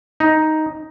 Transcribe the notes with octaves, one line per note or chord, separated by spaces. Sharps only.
D#4